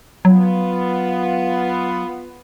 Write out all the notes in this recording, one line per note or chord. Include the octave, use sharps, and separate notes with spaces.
F#3 B3 F4